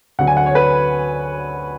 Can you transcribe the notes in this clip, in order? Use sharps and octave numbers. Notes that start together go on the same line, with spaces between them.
D2 D3 F#3 F#5
G#5
F#5
C#5
B4